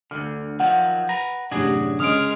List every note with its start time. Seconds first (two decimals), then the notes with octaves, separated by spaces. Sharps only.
0.11 D2 G#2 D3 F6
0.60 D#3 F3 F#3 F#5
1.09 B4 A#5
1.51 A1 F#2 C3 D4 F#4 G#4
2.00 C#3 G#3 D#6 F6 D7